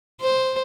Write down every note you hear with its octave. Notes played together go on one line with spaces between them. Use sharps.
C5